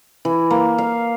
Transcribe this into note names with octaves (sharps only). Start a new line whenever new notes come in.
E3
A#3
F5